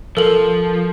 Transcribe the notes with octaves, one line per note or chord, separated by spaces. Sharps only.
F3 A4 A#4 F#7